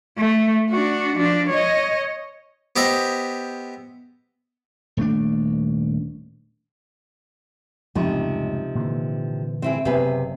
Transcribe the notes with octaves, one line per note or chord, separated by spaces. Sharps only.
A3
D4 F#4
F3 D4
C#5 D#5
B3 G4 C5 D#5 E5
D#1 A3 D4
C#2 F#2 A2 C3 F3 D#4
A#2 D3 E3
C4 E4 G#4
F#1 C3 B3 G#4 B4